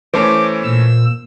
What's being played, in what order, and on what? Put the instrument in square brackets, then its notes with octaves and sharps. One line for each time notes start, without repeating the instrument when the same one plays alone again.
[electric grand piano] E3 A3 C#4 [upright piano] C5 [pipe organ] D6
[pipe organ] A#2 E6